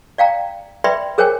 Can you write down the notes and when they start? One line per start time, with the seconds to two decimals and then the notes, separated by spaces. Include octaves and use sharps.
0.18 D5 F5 G5 A#5
0.84 B4 D5 E5 G5 B5 C6
1.18 G#4 A#4 C5 C#5 G5 G#5